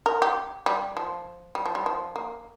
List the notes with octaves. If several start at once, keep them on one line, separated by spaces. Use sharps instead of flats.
A#4
G4
G3
F3
G3
F3
G3
F3
A#3